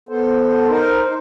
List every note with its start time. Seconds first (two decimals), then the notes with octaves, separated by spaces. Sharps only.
0.09 B3 A4 C5
0.69 D#4 A#4 C5
1.07 D#4 C5